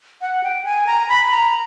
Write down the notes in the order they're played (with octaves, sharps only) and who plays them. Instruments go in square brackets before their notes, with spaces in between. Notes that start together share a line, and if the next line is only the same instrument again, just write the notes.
[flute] F#5
G5
G#5
A#5
B5
A#5